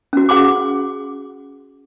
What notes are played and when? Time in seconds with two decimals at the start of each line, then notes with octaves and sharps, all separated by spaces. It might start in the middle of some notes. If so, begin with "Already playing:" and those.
0.13 C#4 F#4
0.29 G#4 F#5 C6 D6